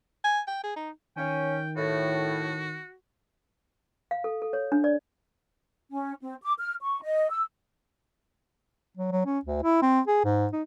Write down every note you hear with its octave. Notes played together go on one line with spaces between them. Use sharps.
G#5
G5
G#4
D#4
D#3 C#4 G5
A2 F#4
F5
A4
A4
C#5
D4
D5
C#4
C4
D6
F6
C#6
D#5
E6
F#3
F#3
C#4
D2
E4
C4
G#4
G#2
D#4